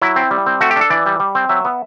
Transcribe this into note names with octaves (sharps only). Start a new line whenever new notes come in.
F#3 E4
C4
G3
C4
A3 F#4
G4
D4 A4
E3 D5
G3
G3
C4
F#3 E5
B3